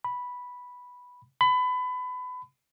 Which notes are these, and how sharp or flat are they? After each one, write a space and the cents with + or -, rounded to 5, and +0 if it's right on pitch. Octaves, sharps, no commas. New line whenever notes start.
B5 -5
B5 +25